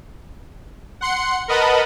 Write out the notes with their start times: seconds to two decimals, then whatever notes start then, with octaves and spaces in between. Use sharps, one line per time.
1.01 F#5 C6 C#7
1.48 A#4 B4 D#5 F#5 A5 B5